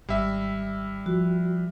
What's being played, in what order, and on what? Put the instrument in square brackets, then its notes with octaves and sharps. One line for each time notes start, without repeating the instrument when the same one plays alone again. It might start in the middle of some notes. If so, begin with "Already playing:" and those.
[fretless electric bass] G#1 [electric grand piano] G3 E5
[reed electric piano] F3 [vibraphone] F#4